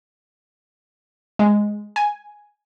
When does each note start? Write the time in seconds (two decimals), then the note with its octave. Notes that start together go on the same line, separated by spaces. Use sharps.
1.39 G#3
1.96 G#5